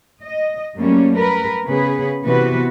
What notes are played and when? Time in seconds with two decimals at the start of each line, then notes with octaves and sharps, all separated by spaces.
0.22 D#5
0.76 F#2 G3 A3 A#3 C#4
1.16 A#4 B4
1.66 C#3 B3 G#4 B4
2.25 C3 E3 B3 F#4 B4